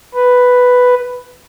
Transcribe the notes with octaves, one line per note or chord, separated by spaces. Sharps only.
B4